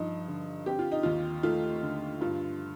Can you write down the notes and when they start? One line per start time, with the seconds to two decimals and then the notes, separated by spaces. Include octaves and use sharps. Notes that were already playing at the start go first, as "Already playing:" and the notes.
Already playing: G2 F3 D#4
0.28 D3
0.66 C4 G4
0.79 F4
0.92 D#4
1.03 D#2 F4
1.43 A3 F4
1.82 D3
2.21 G2 F4